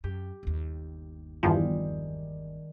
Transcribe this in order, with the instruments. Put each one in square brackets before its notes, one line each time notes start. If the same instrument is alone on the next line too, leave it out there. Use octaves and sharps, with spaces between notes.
[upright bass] F#2 [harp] G4
[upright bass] G1 D#2
[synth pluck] E2 G2 F3 [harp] D#3 G3 G#3